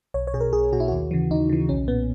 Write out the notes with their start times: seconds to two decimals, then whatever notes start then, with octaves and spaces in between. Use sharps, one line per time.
0.14 B1 C#5
0.27 C#5
0.34 B2 G#4
0.41 A#4
0.53 B1 G#4
0.72 B2 F#4
0.80 E4
0.88 D#2 F#4
1.11 C#3 E3
1.31 D#2 D#4
1.49 C#3 E3
1.69 B1 C#4
1.88 A#2 B3